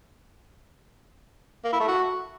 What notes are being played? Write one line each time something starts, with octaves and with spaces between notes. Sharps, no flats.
A#3
E4
A3
F#4